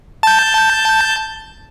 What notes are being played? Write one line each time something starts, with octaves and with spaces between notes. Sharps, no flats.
A5 G6